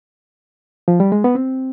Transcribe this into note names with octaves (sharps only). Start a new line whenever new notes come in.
F3
G3
G#3
B3
C4